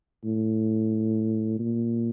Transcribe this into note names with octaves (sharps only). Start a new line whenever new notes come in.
A2
A#2